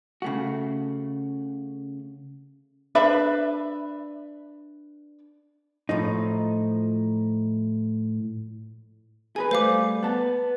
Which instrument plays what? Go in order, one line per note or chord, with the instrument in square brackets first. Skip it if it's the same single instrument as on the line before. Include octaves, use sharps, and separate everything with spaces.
[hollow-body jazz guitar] C#3 A3 F#4
[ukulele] D4 B4 E5 B5
[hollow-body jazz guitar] A2 F3 D#4
[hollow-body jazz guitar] G#4 A#4 B4 [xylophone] G#5
[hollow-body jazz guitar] G3 A3 [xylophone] C5 F5 D6
[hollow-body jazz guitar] B3 A5